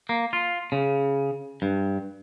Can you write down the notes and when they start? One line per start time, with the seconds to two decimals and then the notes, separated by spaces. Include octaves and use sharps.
0.09 A#3
0.33 F4
0.72 C#3
1.62 G2